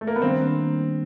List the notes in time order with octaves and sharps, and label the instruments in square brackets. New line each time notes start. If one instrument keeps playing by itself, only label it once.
[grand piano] A3
A#3
B3
[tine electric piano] D#3 G3 A#3 D4 [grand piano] C4